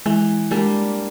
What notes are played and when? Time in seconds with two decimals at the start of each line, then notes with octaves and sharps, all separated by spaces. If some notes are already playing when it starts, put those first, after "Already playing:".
0.06 E3 G#3
0.51 G3 G#3 A#3 D4